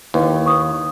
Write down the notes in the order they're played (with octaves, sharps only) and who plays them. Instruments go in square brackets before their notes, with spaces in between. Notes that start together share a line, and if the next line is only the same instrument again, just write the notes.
[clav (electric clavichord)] D#2 [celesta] E4 B4
[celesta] C#6 D#6